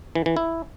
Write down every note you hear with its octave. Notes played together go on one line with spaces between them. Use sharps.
E3
E3
E4